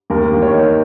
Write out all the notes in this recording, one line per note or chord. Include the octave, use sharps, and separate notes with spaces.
D#2 A#4
D#2
C#5
D#3